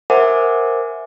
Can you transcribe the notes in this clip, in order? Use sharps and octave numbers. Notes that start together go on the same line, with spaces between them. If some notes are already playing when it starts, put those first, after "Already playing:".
A#4 C5 E5 F#5 G#5 D6